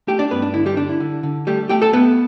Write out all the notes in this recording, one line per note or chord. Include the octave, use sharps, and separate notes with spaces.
A3 G4 G5
D4 D5
G2 B3 B4
D4
D3 E4
G3 G4
D3 D4
E4
D3
D3
G3 A3 G4
A3 G4 G5
A4 A5
A3 B3 B4